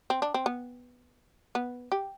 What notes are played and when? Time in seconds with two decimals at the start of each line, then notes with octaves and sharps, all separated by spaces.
0.10 C4
0.22 D4
0.34 C4
0.46 B3
1.55 B3
1.92 G4